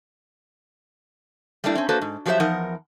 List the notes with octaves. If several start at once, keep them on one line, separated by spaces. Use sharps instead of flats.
G3 A3 A#3 D4 E4
C4 C#4
A#3 D4 F#4 A4 B4 C5
G#2
F3 F#3 G4 A4 C5 E5
E2 F3 D#4 A#4 F#5